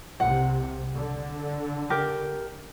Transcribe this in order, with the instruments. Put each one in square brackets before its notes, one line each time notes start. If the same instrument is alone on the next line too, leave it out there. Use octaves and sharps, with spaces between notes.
[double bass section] C2 C3 [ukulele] F#5
[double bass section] D3
[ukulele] G4 A#4